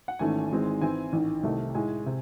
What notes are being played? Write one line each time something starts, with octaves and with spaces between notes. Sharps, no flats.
F#5
G#1 G#2 E3 A3 C#4 G#5
G#1 G#2 E3 G#3 C4
G#2 E3 C4 E4 G#5
A1 G#2 D#3
C2 C3 D#3 A3 D#4
A2 G#3 D#4 G#5
C3